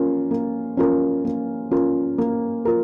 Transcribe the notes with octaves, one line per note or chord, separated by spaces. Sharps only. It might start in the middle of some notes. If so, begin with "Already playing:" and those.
Already playing: A#3 C#4 F4 A#4
A#3
C#4 F4 A#4
A#3
C#4 F4 A#4
A#3
F4 A#4